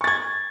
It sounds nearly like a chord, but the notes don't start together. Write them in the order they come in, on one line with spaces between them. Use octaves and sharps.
C#6 A6 G#6